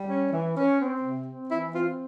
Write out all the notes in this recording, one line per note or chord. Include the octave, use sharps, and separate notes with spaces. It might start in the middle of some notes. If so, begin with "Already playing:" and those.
Already playing: G3
C#4
E3
C#4
C4
C3
C4
E3 E4
C4 F4